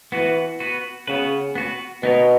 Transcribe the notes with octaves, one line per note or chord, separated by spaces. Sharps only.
E3 B3 F#4 B4
B3 F#4 B4
C#3 B3 F#4 B4
B3 F#4 B4
B2 B3 D#4 A#4 C#5